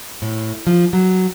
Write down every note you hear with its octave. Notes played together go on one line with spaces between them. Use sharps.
A2
F3
F#3